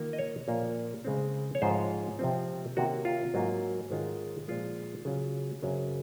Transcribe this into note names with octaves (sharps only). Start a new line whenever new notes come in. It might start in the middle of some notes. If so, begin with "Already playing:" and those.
Already playing: D#3 A#3 F4
D#5
C#5
A#2 F3 A#3
C#3 G#3 C4
C#5
G#2 F3 G#3 C#4 F4 C5
C3 F3 C4
C3 D#3 A#3 C#4 F#4
F4
G#2 F#3 A#3
G#2 D#3 G#3 C#4 F4
A#2 F3 G#3 F4
C#3 F#3 C#4 F4
F#2 C#3 F#3 C4